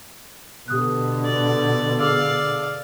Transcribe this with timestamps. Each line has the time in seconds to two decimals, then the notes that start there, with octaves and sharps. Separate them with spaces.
0.68 B2 D3 G4 D#6 F#6
1.25 D5
2.00 G#4 D5 F5 D6 E6